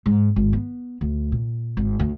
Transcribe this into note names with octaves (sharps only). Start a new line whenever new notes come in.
G#2
G#1
B3
D2
A#2
G#1
D2